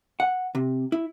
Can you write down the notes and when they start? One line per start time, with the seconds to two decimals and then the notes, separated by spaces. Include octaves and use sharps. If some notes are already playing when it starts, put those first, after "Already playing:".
0.20 F#5
0.55 C3
0.92 E4